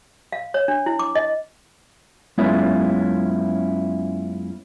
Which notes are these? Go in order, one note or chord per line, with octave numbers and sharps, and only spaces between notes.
F5
C#5
D4
E4
D6
D#5
F#2 G#3 B3 C#4 E4 F4